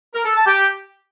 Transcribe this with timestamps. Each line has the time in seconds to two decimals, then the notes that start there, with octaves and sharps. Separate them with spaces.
0.15 A#4
0.25 A4
0.36 A5
0.47 G4